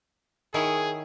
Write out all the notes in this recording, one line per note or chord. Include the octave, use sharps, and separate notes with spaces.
D#3 E4 G#4 C#5